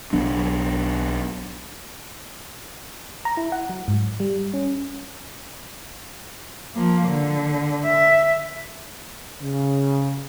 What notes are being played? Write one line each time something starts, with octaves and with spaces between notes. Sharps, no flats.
B1 F#3 B3 D4
A#5
E4
F#5
F#3
G#2
G3
C#4
F3 A#3
D3
E5
C#3